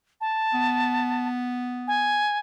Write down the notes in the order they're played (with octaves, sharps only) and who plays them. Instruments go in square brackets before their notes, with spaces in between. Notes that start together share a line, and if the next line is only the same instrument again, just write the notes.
[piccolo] A5
[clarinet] B3
[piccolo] G#5